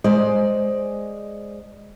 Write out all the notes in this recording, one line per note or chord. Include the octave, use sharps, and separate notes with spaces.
G#3 C5 D5 D#5